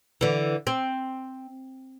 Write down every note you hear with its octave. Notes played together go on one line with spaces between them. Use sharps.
D3 E3
C4